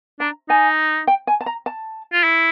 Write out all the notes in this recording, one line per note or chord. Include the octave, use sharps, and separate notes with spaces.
D4 A#5
D#4 G#5
G5
G#5
A5
A#5
A5
F4
E4